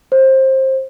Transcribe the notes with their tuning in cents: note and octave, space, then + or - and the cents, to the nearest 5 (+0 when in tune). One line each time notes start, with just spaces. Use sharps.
C5 +20